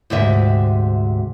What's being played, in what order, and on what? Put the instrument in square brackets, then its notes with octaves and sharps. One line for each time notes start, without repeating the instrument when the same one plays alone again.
[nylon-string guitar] D2 G#2 C3 E5